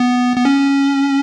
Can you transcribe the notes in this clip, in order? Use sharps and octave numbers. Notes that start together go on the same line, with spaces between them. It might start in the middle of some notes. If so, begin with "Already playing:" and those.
Already playing: B3
B3
C#4